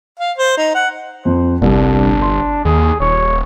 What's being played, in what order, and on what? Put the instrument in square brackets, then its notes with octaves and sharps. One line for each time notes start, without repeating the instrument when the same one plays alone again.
[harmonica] F5
C5
D#4
F#5
[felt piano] F2 [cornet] C5
[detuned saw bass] G1 [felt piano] C2 [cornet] D4
[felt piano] C6
[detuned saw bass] D#2 [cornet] G#4
[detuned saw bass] D#1 [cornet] C#5